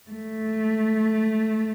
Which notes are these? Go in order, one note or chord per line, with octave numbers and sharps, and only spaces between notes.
A3